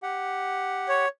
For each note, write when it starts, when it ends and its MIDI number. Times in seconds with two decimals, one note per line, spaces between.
0.03 1.06 67
0.03 1.06 78
0.89 1.08 73